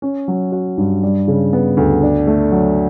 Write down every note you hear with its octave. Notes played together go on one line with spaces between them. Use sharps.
C#4
F#3
F#4
G2
G3
C#3
B3
D2
D4
A3
F#3